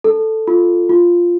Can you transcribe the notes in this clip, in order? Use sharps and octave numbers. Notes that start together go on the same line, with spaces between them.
A4
F4
F4